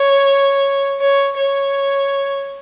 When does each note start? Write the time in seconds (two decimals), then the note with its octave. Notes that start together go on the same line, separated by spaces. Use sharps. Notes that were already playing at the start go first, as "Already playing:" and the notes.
Already playing: C#5
1.00 C#5
1.37 C#5